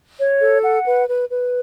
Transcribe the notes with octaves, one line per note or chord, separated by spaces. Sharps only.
C#5
A4
F#5
B4
B4
B4